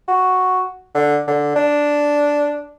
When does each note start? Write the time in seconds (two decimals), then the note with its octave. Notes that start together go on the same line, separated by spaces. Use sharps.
0.08 F#4
0.94 D3
1.27 D3
1.56 D4